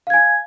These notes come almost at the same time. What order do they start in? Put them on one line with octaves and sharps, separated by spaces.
F5 G#6 G#5